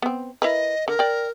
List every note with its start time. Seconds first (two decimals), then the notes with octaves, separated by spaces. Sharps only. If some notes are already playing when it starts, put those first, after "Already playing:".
0.02 B3 C4
0.42 E4 A#4 B4 D#5
0.88 D3 A#4
0.99 D5 G5